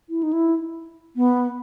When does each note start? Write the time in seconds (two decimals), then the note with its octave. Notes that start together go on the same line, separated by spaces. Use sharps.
0.10 E4
0.23 D#4
0.33 E4
1.16 B3